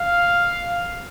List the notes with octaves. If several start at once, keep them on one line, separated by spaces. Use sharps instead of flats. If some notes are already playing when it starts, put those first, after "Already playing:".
Already playing: F5